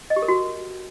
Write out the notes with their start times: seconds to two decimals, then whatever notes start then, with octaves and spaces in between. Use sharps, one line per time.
0.10 D#5
0.16 G4
0.22 A#4
0.28 F#4